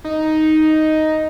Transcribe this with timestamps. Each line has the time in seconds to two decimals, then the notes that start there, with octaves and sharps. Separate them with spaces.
0.05 D#4